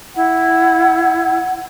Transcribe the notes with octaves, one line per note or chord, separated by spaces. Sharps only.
E4 F#5